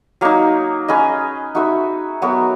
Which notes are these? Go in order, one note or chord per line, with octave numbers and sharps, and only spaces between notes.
F#3 A#3 D#4
C#4 G#4 B4 D#5
D#4 F#4 B4 E5
F#3 B3 F#4 A#4